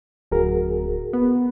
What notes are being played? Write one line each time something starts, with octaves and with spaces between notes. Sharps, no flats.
D1 F#4 G#4 A#4
B3